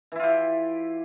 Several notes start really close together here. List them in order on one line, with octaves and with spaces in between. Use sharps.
E3 E4 F4 G4